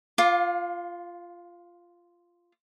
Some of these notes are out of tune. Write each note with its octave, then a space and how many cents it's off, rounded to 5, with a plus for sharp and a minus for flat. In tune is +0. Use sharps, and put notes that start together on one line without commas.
F4 -5 F5 +30 D6 +0